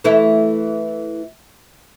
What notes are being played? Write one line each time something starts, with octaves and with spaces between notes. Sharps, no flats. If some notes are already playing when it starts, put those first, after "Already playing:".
E3 A3 E4